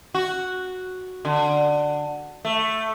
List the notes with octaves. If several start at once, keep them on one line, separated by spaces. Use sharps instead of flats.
F#4
D3
A3